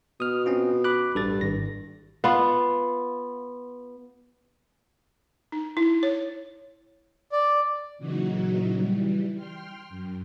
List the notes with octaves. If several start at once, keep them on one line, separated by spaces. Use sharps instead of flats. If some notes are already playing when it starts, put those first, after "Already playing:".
B2 D#6 F6
C4 C#4 F4
B5 D6 F#6
A1 G2 A4 A6
G#1 A#6
B3 F4
D#4
E4
C#5
D5
A#2 C#3 E3 F#3 D#4 F#4
E3 G3
G5 C6 F6
F#2